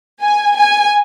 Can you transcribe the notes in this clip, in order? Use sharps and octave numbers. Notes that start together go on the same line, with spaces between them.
G#5
G#5